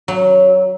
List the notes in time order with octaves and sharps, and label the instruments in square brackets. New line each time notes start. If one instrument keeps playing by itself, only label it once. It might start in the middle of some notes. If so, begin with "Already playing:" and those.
[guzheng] F#3